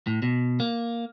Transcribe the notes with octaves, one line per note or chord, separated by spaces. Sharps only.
A2
B2
A#3